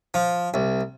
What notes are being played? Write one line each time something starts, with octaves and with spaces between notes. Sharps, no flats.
F3
C2